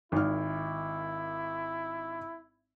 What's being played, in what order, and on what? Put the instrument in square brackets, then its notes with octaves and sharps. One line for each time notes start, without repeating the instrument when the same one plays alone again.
[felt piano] G#1 D#3 F6 [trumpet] E4